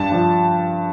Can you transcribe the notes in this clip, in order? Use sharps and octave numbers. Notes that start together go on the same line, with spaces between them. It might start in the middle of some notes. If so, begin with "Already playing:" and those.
Already playing: G2 A5
F3 D4